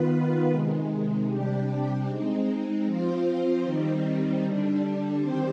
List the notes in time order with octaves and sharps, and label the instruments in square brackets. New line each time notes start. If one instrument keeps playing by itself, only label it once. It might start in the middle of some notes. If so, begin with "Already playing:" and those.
Already playing: [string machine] D#3 B3 F4 B4
C3 D#3 G#3
C3 G3 D4 G4
G#3 C4 D#4
F3 C4 F4 C5
D#3 G3 C4 D#4
D3 G3 D4
D#3 G3 C4 G4 C5